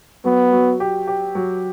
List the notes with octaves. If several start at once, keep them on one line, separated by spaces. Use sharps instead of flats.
F#3 B3
F#3
G4
G4
F#3